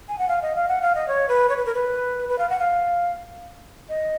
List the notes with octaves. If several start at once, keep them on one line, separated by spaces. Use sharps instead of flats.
G#5
F#5
F5
D#5
F5
F#5
F5
D#5
C#5
B4
C#5
B4
A#4
B4
B4
F5
F#5
F5
D#5